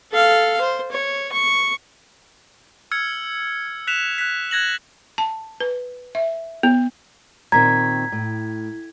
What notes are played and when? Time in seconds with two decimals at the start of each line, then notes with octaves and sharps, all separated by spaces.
0.12 A4 F5
0.61 C5
0.91 C#5
1.32 C#6
2.91 E6 F6 G#6 C#7
3.87 F#6 B6 E7 F7
4.18 F#6 B6
4.51 F#6 G#6 A#6 F#7
5.18 A5
5.60 B4
6.15 E5
6.63 B3
7.52 A#2 D#3 C4 A#5 G#6 B6
8.12 A2